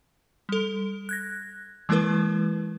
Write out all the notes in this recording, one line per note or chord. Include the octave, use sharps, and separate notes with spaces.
G3 A4
F#6 G#6 A#6
E3 G#3 A#3 E4 A#4 B4